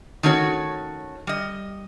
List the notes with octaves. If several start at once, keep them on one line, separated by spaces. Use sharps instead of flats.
D#3 A3 C#4 F#4 C#5
G3 D#5